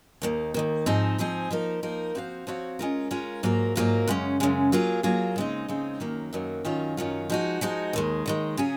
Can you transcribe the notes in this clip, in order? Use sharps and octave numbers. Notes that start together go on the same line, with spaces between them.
D#2 D#3 A#3
D#2 D#3 A#3
G#2 F3 C4 D#4 G#4
G#2 F3 C4 D#4 G#4
F3 A#3 D#4 A#4
F3 A#3 D#4 A#4
F3 C4 F#4 C#5 F5
F3 C4 F#4 C#5 F5
G#3 C#4 F4 A#4
G#3 C#4 F4 A#4
G#2 F#3 A#3 F4 A#4
G#2 F#3 A#3 F4 A#4
F#2 C#3 G#3 C#4
F#2 C#3 G#3 C#4
F#3 A#3 F4 G#4
F#3 A#3 F4 G#4
C#3 G#3 C4 D#4
C#3 G#3 C4 D#4
F#2 D#3 F#3 A#3
F#2 D#3 F#3 A#3
F#2 D#3 F#3 C#4 F4
F#2 D#3 F#3 C#4 F4
F3 G#3 D#4 F#4
F3 G#3 D#4 F#4
D#2 D#3 G#3
D#2 D#3 G#3
C#3 F#3 C#4 G#4